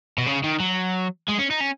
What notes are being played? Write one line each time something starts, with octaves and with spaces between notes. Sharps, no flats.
B2
C#3
D#3
F#3
G#3
C#4
D#4
C#4